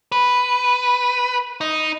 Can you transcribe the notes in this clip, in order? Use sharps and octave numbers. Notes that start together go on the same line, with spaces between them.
B4
D#4